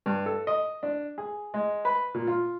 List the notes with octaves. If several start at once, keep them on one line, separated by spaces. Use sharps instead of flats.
G2
A4
D#5
D4
G#4
G#3
B4
A#2
F4